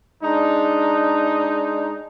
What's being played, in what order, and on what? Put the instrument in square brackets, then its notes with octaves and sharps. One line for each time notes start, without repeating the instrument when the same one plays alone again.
[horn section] G#3 D4 D#4